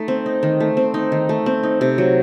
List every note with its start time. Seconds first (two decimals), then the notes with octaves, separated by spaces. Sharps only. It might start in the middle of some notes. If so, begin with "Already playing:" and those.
Already playing: A3 D#4
0.08 C4
0.26 D#4
0.43 D#3
0.60 A3
0.77 C4
0.94 D#4
1.12 D#3
1.29 A3
1.46 C4
1.63 D#4
1.81 C3
1.98 F#3